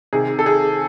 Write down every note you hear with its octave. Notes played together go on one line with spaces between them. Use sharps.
C3 D#3 G#4
A4
G#4